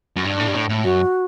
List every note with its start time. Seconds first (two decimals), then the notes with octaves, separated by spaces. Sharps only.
0.16 F#2
0.24 G2 D4
0.40 A2
0.48 G2
0.54 A2
0.69 A2
0.84 F#2 F#4